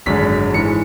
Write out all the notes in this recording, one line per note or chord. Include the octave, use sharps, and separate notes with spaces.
G#1 F#2 D3 G#3 B6
G#2 E3 G#3 C#7